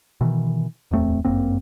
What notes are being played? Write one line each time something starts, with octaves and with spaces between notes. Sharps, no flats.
B2 D#3 E3
D1 E2 A3 C4
G1 F#2 A#3 C4